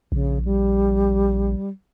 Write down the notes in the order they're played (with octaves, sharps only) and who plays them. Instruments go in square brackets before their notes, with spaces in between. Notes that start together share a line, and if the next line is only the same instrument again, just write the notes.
[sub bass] A#1 [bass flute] C#3
[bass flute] G3